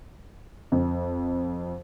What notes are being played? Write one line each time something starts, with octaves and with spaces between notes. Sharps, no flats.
F2